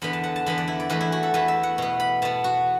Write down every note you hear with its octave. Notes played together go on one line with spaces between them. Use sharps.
E2 D3 B3 B5
A5
F#5
A5
E2 D3 B3 B5
D5
E4
D5
E2 E3 A3 B4
E4
F#4
A4
E2 E3 A3 B4
E5
F#5
B2 B3
B5
B2 B3 A5
F#4